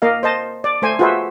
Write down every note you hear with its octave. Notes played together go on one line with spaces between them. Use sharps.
A#3 A#4 D#5 F5
C5 D#5 A5
D5
A3 C5 G#5
F4 F#4 G#4 B4 C5 E5